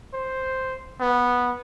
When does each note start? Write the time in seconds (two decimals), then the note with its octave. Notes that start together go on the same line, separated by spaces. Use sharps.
0.14 C5
1.00 B3